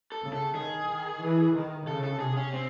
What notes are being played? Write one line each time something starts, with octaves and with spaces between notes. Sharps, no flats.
A4
C#3
A4
D#3 G#4
D#3
E3
D#3
C#3 A4
A4
C3 G#4
C#4
C4